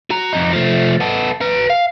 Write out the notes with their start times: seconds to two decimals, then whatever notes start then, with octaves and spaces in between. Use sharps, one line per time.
0.10 F#4 A#5
0.33 F2 D#4
0.53 F3 A3
1.00 B3 A4
1.41 B4 A#5
1.70 F5